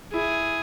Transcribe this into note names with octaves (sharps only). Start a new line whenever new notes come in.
E4 G#4